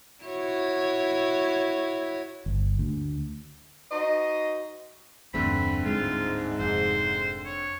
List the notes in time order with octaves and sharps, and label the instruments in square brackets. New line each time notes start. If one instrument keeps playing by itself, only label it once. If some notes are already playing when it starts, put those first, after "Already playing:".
[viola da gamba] E4 F#4 C#5
[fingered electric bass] G1
D2
[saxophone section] D#4 F#4 C5 D#5
[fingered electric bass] E1 G2 [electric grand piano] D3 A3 C4 [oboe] B5
[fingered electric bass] D1 G3 G#3 [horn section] G#2 [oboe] F4
[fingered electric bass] F1 [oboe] C5
[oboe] C#5